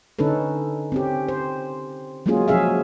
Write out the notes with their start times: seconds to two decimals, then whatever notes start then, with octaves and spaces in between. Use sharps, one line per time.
0.19 D3 C#4 D#4 A4 B4
0.92 C4 C#4 G4
1.28 C5
2.26 F#3 G#3 A#3 C#4 F4 G#4
2.48 F3 F#3 C#4 G#4 E5 F5